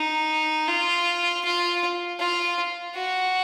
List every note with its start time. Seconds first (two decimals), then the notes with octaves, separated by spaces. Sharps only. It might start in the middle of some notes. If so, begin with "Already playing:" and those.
Already playing: D#4
0.68 F4
1.44 F4
2.19 F4
2.95 F#4